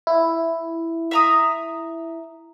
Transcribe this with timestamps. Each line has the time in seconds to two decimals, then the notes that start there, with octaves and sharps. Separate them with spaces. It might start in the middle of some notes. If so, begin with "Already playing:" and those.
0.07 E4
1.11 E5 A#5 D#6